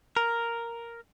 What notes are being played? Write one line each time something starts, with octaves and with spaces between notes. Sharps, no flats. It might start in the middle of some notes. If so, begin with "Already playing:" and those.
A#4